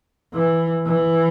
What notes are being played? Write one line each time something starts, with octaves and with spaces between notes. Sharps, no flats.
E3
E3